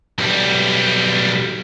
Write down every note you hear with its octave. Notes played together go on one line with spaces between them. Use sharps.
B1 G3